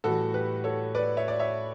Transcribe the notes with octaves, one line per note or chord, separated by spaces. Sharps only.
A2 E3 G3 F#4 A4
G4 B4
A4 C#5
B4 D5
C#5 E5
D5
C#5 E5